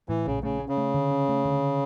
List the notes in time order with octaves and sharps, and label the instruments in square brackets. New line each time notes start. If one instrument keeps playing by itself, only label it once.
[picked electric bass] A2 [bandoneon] E3
[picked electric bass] A#1 [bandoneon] C#3
[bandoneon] C#3 [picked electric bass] A3
[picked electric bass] C#4
[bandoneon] C#3
[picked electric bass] A3
D3
C#4
A3
D3